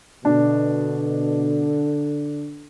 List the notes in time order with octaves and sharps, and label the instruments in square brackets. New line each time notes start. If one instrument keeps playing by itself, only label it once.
[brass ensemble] B2 [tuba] D3 [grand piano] D4